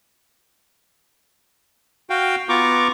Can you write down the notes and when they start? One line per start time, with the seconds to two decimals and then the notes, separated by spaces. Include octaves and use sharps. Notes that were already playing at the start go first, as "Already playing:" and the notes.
2.10 F#4 F5 G5
2.49 B3 F4 A#5 C#6 D6